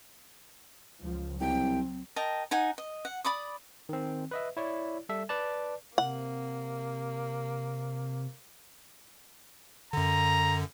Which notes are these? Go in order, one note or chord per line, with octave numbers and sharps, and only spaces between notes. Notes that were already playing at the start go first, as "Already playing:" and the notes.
C#2 F3
C2 F#3 C4 G5
A#4 D#5 G5 A5
D#4 F#5 G#5
D#5
F#5
D5 B5 D6 D#6
D#3 C4
B4 D#5 E5
E4 C#5 D5
G3 A4 E5
B4 D5 A5
C3 A#3 F#5
F#2 D3 A#5